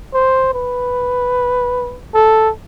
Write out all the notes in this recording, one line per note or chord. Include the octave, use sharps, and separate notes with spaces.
C5
B4
A4